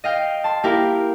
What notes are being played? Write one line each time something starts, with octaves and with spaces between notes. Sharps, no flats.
D#5 F5 G5
A5 C6
A#3 E4 G4 A#4 F5 G5